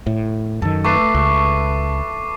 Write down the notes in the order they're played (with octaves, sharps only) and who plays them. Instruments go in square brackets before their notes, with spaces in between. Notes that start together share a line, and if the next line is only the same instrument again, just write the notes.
[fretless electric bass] A2
[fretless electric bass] F#2 D#3 [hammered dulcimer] A4
[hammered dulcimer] A3 B4 A5 [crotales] C#6 D6 C7
[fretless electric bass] C#2